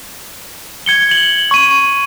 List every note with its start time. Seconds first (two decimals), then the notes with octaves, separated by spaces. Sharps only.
0.86 G#6 C#7 G7
1.11 F#7
1.51 C#6 D#7